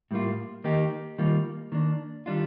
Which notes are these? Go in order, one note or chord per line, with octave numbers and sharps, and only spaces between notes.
A2 G3 A#3 F4
D#3 A#3 D#4 G4
D#3 G3 A#3 F4
D#3 A#3 D4
D#3 G3 D4 F4